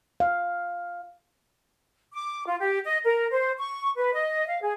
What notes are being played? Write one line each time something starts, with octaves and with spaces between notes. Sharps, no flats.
F5
D6
F4
G4
D#5
A#4
C5
C#6
B4
D#5
F5
G#4